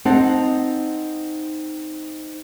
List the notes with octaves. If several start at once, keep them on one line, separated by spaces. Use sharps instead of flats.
C4 D#4 C5 F#5 A5